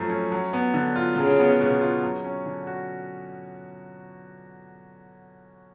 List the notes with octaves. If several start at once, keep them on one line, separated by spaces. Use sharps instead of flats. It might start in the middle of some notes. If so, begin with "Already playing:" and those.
Already playing: F#2 F3 A3
C#4
F#3
B3
D3
F4
C#3 F#3
B3
B2
F4
F#3
C#4
D3
F#4